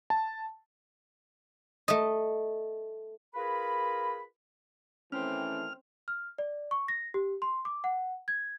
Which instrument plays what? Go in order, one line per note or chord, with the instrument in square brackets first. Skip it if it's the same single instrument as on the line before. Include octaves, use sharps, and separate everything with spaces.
[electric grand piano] A5
[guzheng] A3 D#5
[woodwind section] F4 G#4 A#4 B4 B5
[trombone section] D#3 E3 A3 [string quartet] C4 [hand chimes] C#4 [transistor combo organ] F6
[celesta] F6
D5
C#6
A#6
G4
C6
D6
F#5
G#6